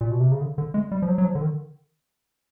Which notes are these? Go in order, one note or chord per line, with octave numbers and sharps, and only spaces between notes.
A#2
B2
C3
C#3
D3
D3
G#3
G3
F3
F#3
F#3
F3
D3
D#3